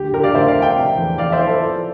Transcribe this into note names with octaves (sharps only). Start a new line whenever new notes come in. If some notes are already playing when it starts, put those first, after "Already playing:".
Already playing: D2 G4
D2 G4 A#4
D5 F5
D2 C5 E5
D5 F5
D2
E5 G5
C3
E2
E2 D5 F5
C5 E5
E3
A4 C5
F3